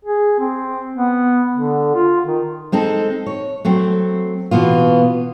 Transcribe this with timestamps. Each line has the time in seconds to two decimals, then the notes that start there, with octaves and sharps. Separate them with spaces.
0.05 G#4
0.40 C4
0.96 B3
1.56 D3
1.95 F4
2.27 D#3
2.72 G#3 C4 D#4 A4
3.26 C#5
3.65 F#3 A3 C4
4.51 B2 E3 B3 F4